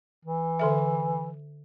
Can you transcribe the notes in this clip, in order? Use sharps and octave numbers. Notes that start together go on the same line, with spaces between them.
E3
D3 A4 E5